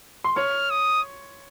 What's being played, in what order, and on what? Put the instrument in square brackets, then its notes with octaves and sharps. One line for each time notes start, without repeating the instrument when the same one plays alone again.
[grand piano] C6
[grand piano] C#5 C#6 [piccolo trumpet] F6
[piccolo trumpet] D#6